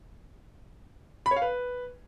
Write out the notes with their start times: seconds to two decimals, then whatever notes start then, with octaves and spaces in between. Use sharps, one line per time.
1.26 B5
1.31 C#5
1.36 F5
1.42 B4